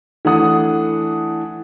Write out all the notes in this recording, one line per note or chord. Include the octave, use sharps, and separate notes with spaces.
E3 A3 D4 F#5 D#6